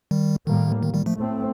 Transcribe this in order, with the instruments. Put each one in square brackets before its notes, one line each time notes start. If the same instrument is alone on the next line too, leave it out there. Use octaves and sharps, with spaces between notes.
[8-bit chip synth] D#3 G3
[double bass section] A2 G3 A#3 [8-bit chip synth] D#3
[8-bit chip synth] D#3
D#3 G3
F3 A3
[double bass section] A2 A3 C4